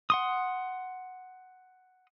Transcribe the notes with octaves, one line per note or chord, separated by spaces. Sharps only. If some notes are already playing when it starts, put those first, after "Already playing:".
F#5 C6 D#6